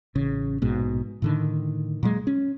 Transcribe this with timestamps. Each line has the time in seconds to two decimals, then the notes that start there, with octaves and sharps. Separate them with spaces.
0.15 A1 C#3
0.62 A#1 G#2 B2
1.22 A2 D3 D#3
2.03 A#2 F#3 G#3
2.27 C#4